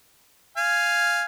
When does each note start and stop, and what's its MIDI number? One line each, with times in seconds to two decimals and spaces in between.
0.57 1.26 77
0.57 1.26 80